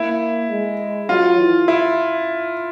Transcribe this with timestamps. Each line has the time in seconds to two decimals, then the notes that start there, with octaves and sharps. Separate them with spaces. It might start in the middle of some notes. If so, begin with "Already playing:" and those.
Already playing: A#3 E4
0.50 G#3
1.09 F#3 F4
1.38 E3
1.68 E4